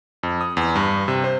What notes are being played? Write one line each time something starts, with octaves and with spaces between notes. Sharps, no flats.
F2
D#6
E2
G2
C3
C5